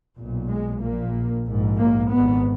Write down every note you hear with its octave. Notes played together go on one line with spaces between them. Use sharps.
B1 A#2
G#3
A#1 A#2 A#3
A#1 G#2
A#3
G#1 G#2 B3